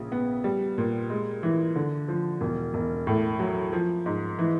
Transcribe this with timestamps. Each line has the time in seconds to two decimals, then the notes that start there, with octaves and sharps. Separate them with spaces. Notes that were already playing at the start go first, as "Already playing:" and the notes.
Already playing: A#1 C#3
0.12 B3
0.44 G3
0.78 A#2
1.10 G#3
1.43 E3
1.75 D3
2.08 F3
2.41 E1
2.74 E1
3.07 A2
3.39 F#3
3.73 F3
4.06 G#2
4.39 E3